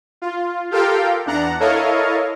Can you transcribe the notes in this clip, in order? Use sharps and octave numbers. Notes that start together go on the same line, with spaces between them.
F4
F4 G4 A4 A#4 F5 G5
E2 D4 F#5 A#5
E4 A4 A#4 C#5 D#5 F5